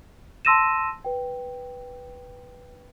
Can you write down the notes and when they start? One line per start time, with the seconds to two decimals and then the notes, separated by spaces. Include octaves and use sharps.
0.45 A5 C6 E6 A#6 D#7 E7
1.05 B4 G5